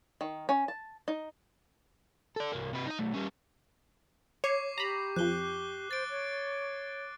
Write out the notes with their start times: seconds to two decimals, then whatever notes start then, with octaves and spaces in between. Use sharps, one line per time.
0.21 D#3
0.49 C#4
0.68 A5
1.08 D#4
2.36 A4 D5
2.53 C2 A#3
2.73 C3 B4
2.87 D#4 D#5
2.99 B1 A3
3.14 G3 C#4
4.44 C#5 C#6 D6 C7
4.78 G4 A#5 B5
5.16 F2 F3 F#6 G7
5.91 C5 A6 D7
6.10 C#5